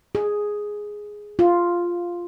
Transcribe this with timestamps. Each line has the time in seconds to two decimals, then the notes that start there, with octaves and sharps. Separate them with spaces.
0.15 G#4
1.39 F4